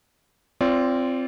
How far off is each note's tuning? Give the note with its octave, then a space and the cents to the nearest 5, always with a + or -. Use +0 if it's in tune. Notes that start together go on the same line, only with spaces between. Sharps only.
C4 +0 F4 -15 D5 -30